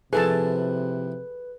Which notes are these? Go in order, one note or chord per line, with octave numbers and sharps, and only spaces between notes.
C3 F3 E4 G#4 A4 B4 A5